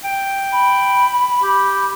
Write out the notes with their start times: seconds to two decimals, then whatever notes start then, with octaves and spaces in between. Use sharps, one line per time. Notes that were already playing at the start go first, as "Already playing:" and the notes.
0.04 G5
0.52 B5
1.43 G4